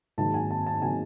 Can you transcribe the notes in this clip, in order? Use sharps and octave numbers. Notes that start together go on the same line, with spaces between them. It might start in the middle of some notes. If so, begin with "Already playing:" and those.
G#2 D#3 F#3 A#3 A5
G#5
A5
A5
D#3 F#3 A#3 G#5